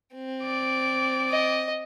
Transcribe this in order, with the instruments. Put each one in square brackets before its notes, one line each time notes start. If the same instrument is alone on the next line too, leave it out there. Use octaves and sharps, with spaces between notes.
[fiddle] C4
[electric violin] D5 D7
[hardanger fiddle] D#5